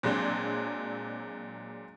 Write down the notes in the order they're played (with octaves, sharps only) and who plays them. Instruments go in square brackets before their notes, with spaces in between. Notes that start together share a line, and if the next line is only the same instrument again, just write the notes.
[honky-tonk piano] A#2 F#3 G#3 C4 D4